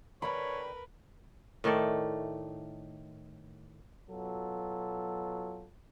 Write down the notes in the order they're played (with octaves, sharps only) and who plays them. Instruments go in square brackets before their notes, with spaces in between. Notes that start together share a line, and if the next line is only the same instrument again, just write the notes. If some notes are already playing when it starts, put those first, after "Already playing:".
[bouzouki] D3 G3 D4 [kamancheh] A#4 B4 [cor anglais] C#5 [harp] B5
[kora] A2 D#3 A3 D5
[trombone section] B2 F#3 F4 A4